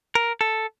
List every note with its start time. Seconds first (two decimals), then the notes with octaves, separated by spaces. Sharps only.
0.15 A#4
0.41 A4